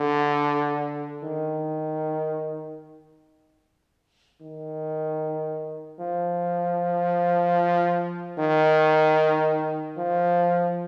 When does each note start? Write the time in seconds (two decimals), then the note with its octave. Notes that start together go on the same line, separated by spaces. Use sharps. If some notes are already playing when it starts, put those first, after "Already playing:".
Already playing: D3
1.24 D#3
4.41 D#3
6.00 F3
8.38 D#3
9.97 F3